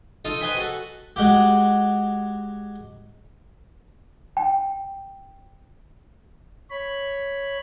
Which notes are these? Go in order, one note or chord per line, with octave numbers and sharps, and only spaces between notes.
D#4 F4 A4
B4 C5 D#5 G5 G#5 B5
F#4 A4
G#3 F#4 G4
G5
C#5 B5